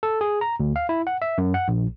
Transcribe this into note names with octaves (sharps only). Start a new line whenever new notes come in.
A4
G#4
A#5
D2
F5
E4
F#5
E5
F#2
F#5
A#1